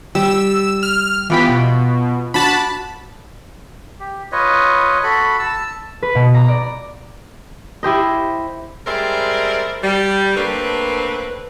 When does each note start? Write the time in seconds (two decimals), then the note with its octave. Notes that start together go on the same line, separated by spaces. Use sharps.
0.15 G3 E6
0.83 F6
1.30 E3 B3 F4 G4 G5 B5
1.49 B2
2.34 D4 F#4 A5 B5
4.00 G4
4.32 F4 B4 C#5 D#5
5.03 F#4 A4 B5
5.39 A5 E6
6.02 B4
6.15 B2
6.34 A#5
6.48 D5
7.83 E4 G4 C5 D#5
8.87 G3 G#3 C4 A#4 D5 E5
9.82 G3
10.36 A3 A#3 C4 D4 B4